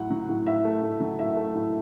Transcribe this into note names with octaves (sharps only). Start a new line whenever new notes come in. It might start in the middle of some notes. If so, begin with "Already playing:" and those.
Already playing: A2 F#3 F#5
F#3
A2
A2 E5
A3
A2
F#3
A2 E5
A3
A2